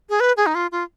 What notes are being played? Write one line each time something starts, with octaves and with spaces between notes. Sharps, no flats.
G#4
B4
G#4
D#4
F4
F4